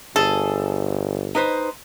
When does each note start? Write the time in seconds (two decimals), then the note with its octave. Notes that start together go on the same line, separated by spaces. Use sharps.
0.16 G1 G#4 A4
1.35 D#4 B4 C5